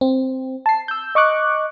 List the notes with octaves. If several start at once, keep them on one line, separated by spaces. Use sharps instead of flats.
C4
A5 C7
E6 G6
D#5 C#6 D6 F#6